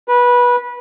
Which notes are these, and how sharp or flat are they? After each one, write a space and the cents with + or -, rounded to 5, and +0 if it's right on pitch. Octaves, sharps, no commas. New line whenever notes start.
B4 -20